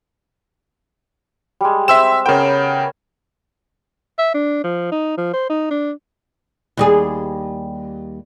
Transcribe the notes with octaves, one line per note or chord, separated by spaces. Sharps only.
G3 G#3
C4 E5 E6 E7
C#3 B3 A#4 C#5 G5
E5
D4
F3
D#4
F3
C5
D#4
D4
D#2 G3 G#4